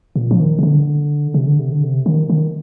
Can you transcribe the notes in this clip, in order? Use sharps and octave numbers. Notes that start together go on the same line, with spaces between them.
A#2
F3
D#3
C3
D3
C3
D3
C3
D3
C3
D#3
D#3